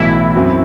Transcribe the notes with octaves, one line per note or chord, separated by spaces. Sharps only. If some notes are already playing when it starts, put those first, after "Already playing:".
Already playing: B1 A2 E3 E4
F#2 F#3 C4 F#4